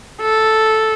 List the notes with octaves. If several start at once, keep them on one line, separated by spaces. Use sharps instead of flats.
A4